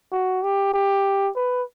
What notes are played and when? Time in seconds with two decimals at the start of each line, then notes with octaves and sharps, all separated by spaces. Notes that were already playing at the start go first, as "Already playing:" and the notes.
0.12 F#4
0.43 G4
0.74 G4
1.36 B4